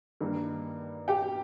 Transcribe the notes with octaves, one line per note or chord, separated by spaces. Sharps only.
G2 D#3 G3 A#3
G4 G5